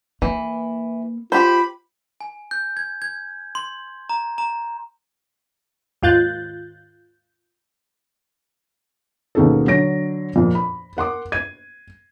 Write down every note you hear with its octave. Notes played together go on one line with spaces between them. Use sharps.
E3 A#3
F4 G4 C5 B5
G#5
G6
G#6
G#6
C6
A#5
A#5
D#2 G#2 F4 F#6 G6 A6
D#2 B2 C#4 D#4 G#4 A4
D3 F#3 C#5 A#6 D7
F2 A#2
B5
A#4 F#5 C6 D6
G#6 D#7